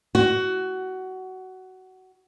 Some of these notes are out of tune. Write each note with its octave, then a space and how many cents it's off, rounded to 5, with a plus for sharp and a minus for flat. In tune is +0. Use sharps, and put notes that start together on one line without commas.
F#4 +15